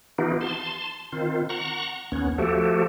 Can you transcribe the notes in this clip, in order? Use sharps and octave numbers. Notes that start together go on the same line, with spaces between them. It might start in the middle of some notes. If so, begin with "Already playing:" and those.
E3 B3 D#4 F4 G4
A5 C6
D#3 C4 F4
F#5 A#5 C#6
D#2 B3 C#4
F3 A3 F#4 G4 A4